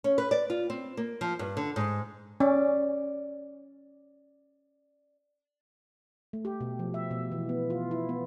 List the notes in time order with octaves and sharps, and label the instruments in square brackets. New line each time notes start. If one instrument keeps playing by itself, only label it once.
[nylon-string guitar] C#4
B4
D5
F4
C4
A#3
F3
G2
D3
G#2
[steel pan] C#4 [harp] D5
[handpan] A3
G4
B2
F3
E5
B2
E3
B3
F4
E4
B3